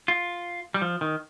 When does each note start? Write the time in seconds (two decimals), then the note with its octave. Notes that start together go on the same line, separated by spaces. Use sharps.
0.08 F4
0.74 G3
0.82 F3
1.01 D#3